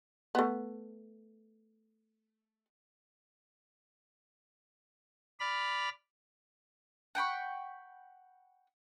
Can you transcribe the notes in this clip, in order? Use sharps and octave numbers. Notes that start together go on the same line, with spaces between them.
A3 B3
D5 B5 F6
F#5 G5 B5 C#6